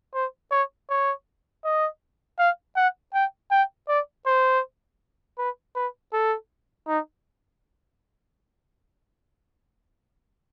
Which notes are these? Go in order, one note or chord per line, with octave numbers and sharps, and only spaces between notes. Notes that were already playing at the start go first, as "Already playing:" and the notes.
C5
C#5
C#5
D#5
F5
F#5
G5
G5
D5
C5
B4
B4
A4
D#4